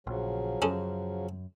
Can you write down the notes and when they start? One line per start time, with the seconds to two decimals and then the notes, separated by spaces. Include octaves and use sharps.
0.07 A#1 C#3 F3 F#3
0.62 F#2 C#4 G#4 A4